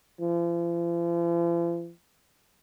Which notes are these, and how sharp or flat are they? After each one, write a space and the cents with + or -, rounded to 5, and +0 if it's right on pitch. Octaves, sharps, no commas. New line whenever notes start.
F3 -45